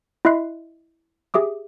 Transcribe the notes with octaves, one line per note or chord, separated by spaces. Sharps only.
E4 D#5 E5 C6 F#6 C7
G4 G#4 E5 D6 D#6